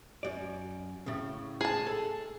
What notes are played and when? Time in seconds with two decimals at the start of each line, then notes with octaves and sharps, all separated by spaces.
0.23 F#2 D5
1.06 A2 C#3
1.61 G#4 A5
1.87 A4